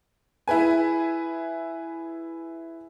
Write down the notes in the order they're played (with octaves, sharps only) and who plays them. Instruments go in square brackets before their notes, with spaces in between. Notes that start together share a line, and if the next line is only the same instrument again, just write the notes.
[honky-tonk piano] E4 G#4 B4 G#5